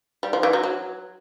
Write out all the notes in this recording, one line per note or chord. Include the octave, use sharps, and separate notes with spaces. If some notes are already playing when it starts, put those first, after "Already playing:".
G3
F3
E3
F#3
F#3